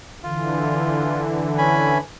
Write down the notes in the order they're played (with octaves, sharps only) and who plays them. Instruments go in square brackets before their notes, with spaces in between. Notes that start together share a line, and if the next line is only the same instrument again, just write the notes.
[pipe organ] D3 E3 [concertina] F4
[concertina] C#4 G#5 B5